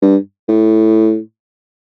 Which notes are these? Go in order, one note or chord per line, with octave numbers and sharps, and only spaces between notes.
G2
A2